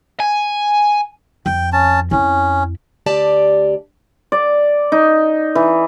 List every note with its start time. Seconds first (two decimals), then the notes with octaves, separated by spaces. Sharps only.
0.20 G#5
1.46 F2 G5
1.73 C#4 A5
2.11 F2 C#4 E4
3.06 D2 G4 D5 A5
4.32 D5
4.92 D#4
5.55 E3